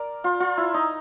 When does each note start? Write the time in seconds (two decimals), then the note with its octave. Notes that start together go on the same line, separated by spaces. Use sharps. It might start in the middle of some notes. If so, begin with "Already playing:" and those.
Already playing: A#4 D5
0.24 F4
0.40 F4
0.57 E4
0.74 D#4